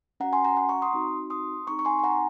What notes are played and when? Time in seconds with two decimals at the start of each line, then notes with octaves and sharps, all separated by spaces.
0.20 C#4 F#4 F#5 A#5
0.33 G#5 C6
0.45 F#5 A#5
0.57 F#5 A#5
0.69 A#5 C#6
0.82 C6 D#6
0.93 C4 D#4 F#4
1.30 C6 D#6
1.67 C4 D#4 G#4 A#5 C#6
1.79 C#6
1.85 G#5 C6
1.99 G#5
2.03 F#5 A#5